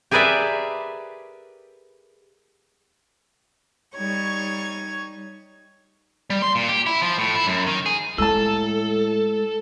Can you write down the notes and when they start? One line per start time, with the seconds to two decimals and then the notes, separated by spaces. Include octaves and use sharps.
0.11 G4 G#4 A#4 B4 D5 E5
3.95 G3 D#4 C#5 C#6 G#6
6.30 G3
6.42 C6
6.55 A#2
6.69 G4
6.86 E4
7.02 F3
7.18 A2
7.35 E4
7.47 F#2
7.67 D#3
7.86 G#4
8.18 A2 G#3 A4 A5 E6